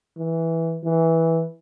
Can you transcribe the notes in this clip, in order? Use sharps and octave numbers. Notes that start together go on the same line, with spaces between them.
E3
E3